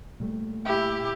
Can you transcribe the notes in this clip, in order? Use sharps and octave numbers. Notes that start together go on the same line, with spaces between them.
A#2 G3 A3
E4 G4